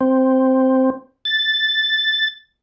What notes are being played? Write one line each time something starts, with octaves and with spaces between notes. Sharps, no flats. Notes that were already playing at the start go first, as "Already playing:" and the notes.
C4
A6